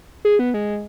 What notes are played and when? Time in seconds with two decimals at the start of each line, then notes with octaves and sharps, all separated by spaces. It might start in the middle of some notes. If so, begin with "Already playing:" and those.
0.25 G#4
0.39 B3
0.54 G#3